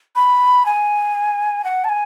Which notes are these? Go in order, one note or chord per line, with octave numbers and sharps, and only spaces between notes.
B5
G#5
F#5
A5
G#5